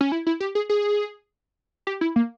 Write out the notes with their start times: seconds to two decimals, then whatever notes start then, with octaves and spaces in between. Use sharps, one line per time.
0.01 C#4
0.12 E4
0.27 E4
0.40 G4
0.55 G#4
0.69 G#4
1.87 G4
2.01 E4
2.16 A#3